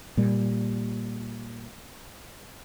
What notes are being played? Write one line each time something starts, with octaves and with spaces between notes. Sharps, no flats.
A#2 G3